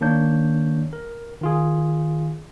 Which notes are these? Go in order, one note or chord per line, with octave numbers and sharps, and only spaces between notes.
D#3 A#3 D4 C#5 G6
A#4
D#3 F4 G#4